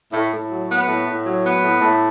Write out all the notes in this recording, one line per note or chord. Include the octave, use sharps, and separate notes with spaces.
A2
A2
F#3
B3
A2
A2
F#3
B3
A2
A2